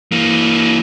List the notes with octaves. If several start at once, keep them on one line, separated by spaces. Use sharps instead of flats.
E3 A#3